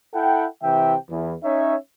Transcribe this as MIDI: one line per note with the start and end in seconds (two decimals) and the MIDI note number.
0.14 0.45 64
0.14 0.45 69
0.14 0.45 78
0.14 0.45 79
0.63 0.95 48
0.63 0.95 52
0.63 0.95 76
0.63 0.95 79
1.09 1.35 40
1.09 1.35 52
1.43 1.75 61
1.43 1.75 63
1.43 1.75 73
1.43 1.75 76